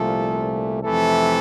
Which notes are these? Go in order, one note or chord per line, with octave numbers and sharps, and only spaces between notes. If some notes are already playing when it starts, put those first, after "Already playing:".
Already playing: C2 A#2 F3 A3 A4
F2 C3 E3 A3 A4